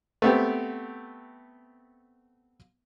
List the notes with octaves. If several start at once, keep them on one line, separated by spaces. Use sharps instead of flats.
A3 B3 C4 G4